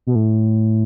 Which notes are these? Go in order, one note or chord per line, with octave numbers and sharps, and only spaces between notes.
B2
A2